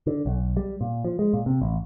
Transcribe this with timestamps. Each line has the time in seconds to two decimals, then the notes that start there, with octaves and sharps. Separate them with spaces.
0.07 D3
0.26 B1
0.57 G3
0.81 A#2
1.04 F3
1.19 G#3
1.33 A#2
1.46 C3
1.62 A1